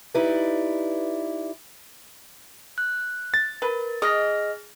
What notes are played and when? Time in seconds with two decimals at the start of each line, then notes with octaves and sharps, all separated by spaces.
0.14 D#4 E4 G4 B4 D5
2.78 F#6
3.34 A6
3.62 A#4 B4
4.02 G#4 D#5 F6 A#6